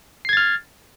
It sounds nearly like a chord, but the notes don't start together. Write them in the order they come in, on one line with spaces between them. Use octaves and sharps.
C7 G#6 A6 F6